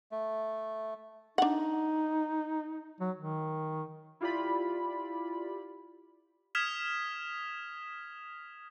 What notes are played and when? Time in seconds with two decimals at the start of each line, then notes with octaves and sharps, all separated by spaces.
0.12 A3
1.38 D4 D#4 F#5
3.01 F#3
3.17 D#3
4.21 E4 F4 G4 D5 B5
6.55 D#6 F6 G#6 B6 E7 F7